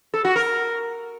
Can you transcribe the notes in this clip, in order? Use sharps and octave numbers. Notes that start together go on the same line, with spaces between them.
A4
F#4
A#4